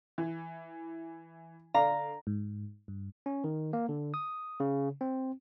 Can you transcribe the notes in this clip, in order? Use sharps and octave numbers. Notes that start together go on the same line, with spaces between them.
E3
D3 D5 F5 A#5
G#2
G2
C#4
D#3
A#3
D3
D#6
C#3
C4